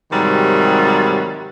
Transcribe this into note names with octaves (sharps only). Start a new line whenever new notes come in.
G#2 C3 D#3 F#3 G3